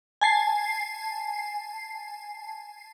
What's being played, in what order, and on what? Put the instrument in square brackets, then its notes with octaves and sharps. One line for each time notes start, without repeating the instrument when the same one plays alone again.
[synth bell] G#5 A5 C7